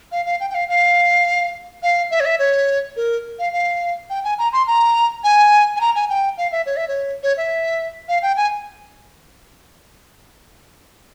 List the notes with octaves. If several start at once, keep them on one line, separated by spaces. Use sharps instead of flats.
F5
F5
G5
G5
F5
F5
F5
E5
C#5
E5
C#5
A#4
F5
F5
G5
G#5
A#5
C6
A#5
G#5
G#5
A#5
G#5
G5
F5
E5
C#5
E5
C#5
C#5
E5
F5
G5
G#5